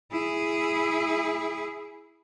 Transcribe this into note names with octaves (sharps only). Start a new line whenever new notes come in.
E4 G#4